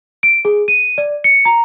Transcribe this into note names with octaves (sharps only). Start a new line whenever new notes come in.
D7
G#4
D#7
D5
C#7
A#5